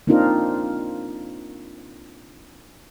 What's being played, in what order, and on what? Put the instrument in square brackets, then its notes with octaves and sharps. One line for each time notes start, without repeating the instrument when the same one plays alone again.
[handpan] A#3 C4 D4 D#4 F4 A#4